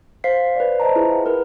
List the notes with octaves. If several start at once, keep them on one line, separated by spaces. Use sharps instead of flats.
C5 F5 B6 C7
B4 C5 D5
C5 D#5 A5 A#5
E4 F4 G#4 B4
F#5
A#4 B4